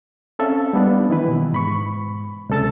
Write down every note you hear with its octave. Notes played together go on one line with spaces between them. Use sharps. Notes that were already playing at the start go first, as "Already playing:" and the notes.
C4 C#4 A4 E5 F5
G3 A#3 B3 D4 D#4
D#3 E3 E4 B4
B2
G#2 B5 C#6
C#2 C3 A4 E6 A6